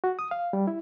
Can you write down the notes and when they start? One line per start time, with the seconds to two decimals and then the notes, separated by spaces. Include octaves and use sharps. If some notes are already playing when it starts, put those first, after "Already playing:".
0.04 F#4
0.19 D#6
0.31 F5
0.53 G3
0.67 E4